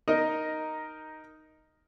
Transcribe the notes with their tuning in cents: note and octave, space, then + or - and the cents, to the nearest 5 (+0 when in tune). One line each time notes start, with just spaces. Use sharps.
D#4 +0 A#4 +0 D#5 +0